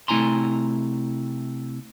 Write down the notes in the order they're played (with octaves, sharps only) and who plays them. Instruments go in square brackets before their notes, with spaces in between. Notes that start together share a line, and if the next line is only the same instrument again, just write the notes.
[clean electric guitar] C3 A3 E4 G#5 A#5 C6